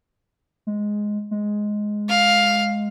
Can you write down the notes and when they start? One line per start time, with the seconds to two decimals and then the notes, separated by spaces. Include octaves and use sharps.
0.67 G#3
1.31 G#3
2.09 F5